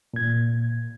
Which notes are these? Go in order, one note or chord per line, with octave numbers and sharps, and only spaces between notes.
A#2 G#6